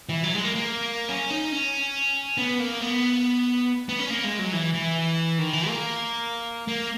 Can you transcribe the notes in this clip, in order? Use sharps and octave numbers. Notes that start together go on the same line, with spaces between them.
E3
F#3
G#3
A#3
A#3
C#4
D#4
C#4
B3
A#3
B3
B3
C#4
A#3
G#3
F#3
E3
E3
D#3
E3
A#3
A#3